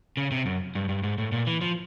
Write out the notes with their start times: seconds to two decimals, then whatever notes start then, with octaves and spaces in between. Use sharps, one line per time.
0.17 C#3
0.32 C3
0.46 F#2
0.75 G2
0.89 G2
1.03 G#2
1.18 A2
1.32 A#2
1.47 E3
1.61 F3